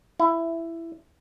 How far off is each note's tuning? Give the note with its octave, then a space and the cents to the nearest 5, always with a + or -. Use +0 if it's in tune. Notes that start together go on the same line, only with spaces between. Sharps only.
E4 +10